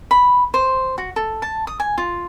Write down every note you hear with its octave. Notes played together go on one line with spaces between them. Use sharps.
B5
C5
F#4
A4
A5
D#6
G#5
F4